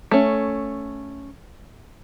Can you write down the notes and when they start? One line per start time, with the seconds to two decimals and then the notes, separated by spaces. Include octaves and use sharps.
0.11 A3 C#4